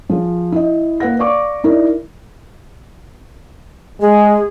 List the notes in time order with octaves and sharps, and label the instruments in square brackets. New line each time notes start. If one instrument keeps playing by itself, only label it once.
[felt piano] F3 G#4
E4 D#5
A#3 B4 F#5 A#6
D5 F5 C#6 D6
D#4 E4 A#4 D5
[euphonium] G#3 [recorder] G#4